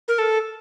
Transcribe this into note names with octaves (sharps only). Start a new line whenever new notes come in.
A#4
A4